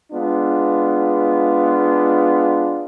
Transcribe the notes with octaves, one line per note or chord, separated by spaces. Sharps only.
G#3 B3 D4 F4